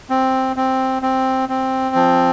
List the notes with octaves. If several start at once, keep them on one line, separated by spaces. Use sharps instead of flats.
C4
C4
C4
C4
F3